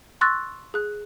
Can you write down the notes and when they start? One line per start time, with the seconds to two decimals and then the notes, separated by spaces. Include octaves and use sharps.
0.21 C6 C#6 E6 F#6 A6 A#6
0.74 G#4 F#6